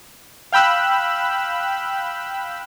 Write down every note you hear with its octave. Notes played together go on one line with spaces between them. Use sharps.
F5 G5 B5 E6 F#6